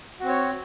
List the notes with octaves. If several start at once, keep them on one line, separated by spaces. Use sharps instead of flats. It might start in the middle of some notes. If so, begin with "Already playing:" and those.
C4 F#4 C#5